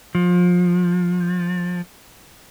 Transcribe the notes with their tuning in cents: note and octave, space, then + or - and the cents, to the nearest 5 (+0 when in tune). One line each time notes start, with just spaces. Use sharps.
F3 +25